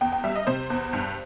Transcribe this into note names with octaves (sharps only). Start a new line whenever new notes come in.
E2 G5
G5
G3 E5
D#5
C3 C5
E2
G2